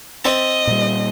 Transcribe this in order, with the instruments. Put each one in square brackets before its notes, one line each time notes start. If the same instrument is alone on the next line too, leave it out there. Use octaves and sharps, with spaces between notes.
[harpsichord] C4 E5 A5 [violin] D#5
[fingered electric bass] A#2 G3